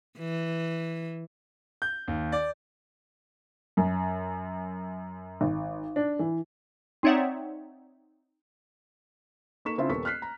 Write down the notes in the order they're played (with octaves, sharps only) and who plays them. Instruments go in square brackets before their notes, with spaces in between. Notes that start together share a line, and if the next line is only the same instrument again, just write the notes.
[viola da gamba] E3
[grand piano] G6
D#2
D5
[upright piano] F#2
G#1
D4
E3
[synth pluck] C4 D#4 C#5 D5 E5 F#5
[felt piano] A#3 D#4 A4 C#6 B6 E7
C#3 C4 D4 E4 F4
D#1 B3 A4 A#4 C#6 B6
F6 F#6 B6 C7
A#5